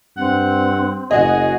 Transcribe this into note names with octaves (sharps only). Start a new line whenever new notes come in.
G2 C4 F#5
F#1 F#4 G#4 D#5